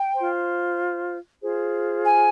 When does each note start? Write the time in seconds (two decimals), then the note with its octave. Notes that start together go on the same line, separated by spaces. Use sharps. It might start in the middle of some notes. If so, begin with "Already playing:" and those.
Already playing: G5
0.15 F4 C5
1.41 F4 G#4 C5
2.05 G#5